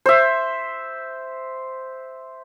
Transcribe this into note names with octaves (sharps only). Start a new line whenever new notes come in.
C5 E5